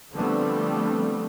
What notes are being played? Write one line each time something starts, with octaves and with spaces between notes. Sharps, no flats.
D3 F3 G3 A3 B3 C4